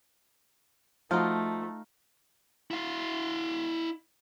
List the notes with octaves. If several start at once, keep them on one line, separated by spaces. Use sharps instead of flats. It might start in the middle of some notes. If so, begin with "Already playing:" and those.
F3 A3 D#4 F4 F#4
E4 F5